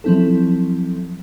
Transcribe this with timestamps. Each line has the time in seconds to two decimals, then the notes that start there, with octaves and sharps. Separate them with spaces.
0.04 F3 F#3 C4 E4 A4